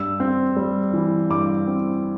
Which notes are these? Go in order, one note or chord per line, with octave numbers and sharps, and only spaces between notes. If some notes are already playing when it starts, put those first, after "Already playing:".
Already playing: G2 E6
C4
G3
E3
G2 D6
C4